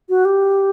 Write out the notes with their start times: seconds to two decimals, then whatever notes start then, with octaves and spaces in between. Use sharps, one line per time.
0.09 F#4
0.25 G4